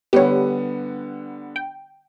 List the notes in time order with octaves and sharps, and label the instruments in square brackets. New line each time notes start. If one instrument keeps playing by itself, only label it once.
[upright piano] D3 G3 B3 [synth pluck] G4 C#5
[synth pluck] G5